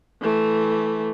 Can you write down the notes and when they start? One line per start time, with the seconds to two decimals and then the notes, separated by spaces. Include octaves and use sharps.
0.22 E3 A3